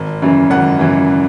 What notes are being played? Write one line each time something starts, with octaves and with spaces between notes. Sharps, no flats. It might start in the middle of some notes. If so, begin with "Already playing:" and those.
Already playing: G#1
F#2 C#3 E3
G#1 F#5
F#2 C#3 E3